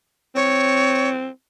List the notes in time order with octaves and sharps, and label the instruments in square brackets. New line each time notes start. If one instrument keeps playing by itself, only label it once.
[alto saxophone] C4 [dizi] C#5